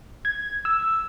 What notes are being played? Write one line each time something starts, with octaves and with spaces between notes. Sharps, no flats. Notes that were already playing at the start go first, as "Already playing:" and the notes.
G#6
E6